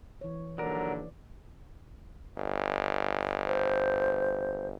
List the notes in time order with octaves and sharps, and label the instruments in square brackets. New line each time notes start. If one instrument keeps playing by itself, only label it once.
[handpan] E3 C#5
[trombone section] A#1 D#2 D3 [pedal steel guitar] F#3 A#4 [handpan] D5
[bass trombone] G1
[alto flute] C5